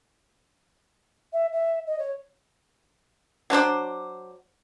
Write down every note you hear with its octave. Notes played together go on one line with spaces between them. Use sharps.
E5
E5
D#5
C#5
F#3 D4 C5 D5